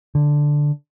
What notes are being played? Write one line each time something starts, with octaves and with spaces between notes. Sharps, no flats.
D3